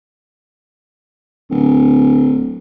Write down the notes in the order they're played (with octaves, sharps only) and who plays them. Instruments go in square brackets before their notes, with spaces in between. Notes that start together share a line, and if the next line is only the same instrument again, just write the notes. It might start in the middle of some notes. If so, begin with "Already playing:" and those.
[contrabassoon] D1